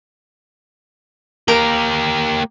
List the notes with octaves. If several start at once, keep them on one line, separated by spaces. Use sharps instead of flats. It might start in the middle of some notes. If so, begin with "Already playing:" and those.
A#3 G4 A#4